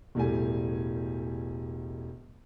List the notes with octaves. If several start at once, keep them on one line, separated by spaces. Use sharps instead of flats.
E1 A2 G3 G#5